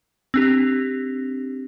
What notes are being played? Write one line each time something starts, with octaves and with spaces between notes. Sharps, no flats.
C4 D4 G4